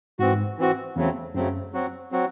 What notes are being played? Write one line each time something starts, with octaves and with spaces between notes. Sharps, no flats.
G#2 E3 C4 F#4
E3 C4 F#4
E2 C#3 F#3 A3 C4
F#2 C#3 F#3 A3 C4
F#3 C4 F#4
F#3 C4 F#4